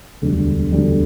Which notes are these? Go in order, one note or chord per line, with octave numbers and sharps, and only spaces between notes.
E1 D2 D3 G3
E1 D2 D3 G3